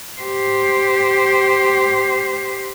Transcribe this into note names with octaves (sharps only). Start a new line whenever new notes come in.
G4 C5